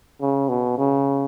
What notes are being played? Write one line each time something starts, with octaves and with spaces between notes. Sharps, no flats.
C#3
B2
C#3